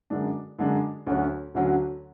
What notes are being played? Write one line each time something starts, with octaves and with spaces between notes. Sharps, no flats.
F#2 D3 G#3 D4
F#2 D3 G#3 D4
D2 D3 F#3 C#4 F#4
D2 D3 F#3 C#4 F#4